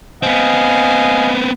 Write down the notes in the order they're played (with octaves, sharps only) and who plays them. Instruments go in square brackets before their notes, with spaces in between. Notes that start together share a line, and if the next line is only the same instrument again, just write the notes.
[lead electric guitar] B3 C4 [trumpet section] D#5 F5 G#5